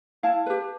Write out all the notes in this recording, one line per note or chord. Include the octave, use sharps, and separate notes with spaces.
E4 F5 A5
G4 B4